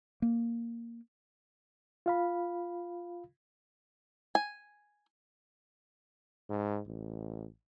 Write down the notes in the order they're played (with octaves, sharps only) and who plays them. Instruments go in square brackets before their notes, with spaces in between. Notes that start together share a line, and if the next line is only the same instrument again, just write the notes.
[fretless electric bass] A#3
[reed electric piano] F4 F5 B5
[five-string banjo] G#5
[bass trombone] G#2
A1